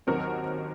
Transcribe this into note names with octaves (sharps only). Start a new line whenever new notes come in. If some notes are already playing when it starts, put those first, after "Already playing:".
D#2 D#3 F#3 C4 F#4 A#4